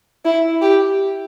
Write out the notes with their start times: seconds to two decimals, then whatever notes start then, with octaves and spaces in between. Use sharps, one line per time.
0.25 E4
0.61 G4